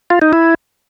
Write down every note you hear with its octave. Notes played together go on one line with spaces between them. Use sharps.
F4
D#4
E4